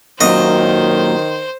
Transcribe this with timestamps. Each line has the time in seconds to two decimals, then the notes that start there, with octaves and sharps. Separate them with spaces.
0.21 F#2 A#2 D#3 F#3 C5 D#5